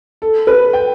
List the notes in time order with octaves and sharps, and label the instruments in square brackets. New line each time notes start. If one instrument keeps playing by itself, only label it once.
[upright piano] A4
B4
G5